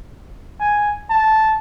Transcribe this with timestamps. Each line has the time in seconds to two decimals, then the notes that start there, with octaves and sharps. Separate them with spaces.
0.60 G#5
1.10 A5